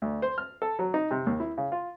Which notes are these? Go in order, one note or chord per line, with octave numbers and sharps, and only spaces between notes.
D2
C5
F6
A4
F#3
D#4
C3
D#2
E4
C#3
F4